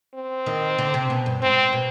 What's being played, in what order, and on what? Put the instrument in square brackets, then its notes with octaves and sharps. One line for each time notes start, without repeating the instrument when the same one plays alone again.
[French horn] C4
[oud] D#3
D3
C3
B2
G2
[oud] G#2 [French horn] C4
[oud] B2